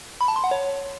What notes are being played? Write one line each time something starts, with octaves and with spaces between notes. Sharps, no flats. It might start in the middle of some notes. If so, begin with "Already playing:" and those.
B5
A5
C6
F#5
C#5